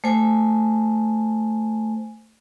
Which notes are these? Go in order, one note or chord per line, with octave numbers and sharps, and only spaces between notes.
A3 C5 G#5